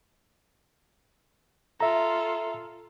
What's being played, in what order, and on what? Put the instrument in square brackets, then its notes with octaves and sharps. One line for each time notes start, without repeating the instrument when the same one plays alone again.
[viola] F4 A4 [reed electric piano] E5 A#5